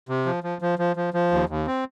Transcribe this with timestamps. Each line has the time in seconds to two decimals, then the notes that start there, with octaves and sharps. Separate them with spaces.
0.09 C3
0.26 F3
0.44 F3
0.62 F3
0.79 F3
0.96 F3
1.14 F3
1.31 D#2
1.49 D#2
1.67 C4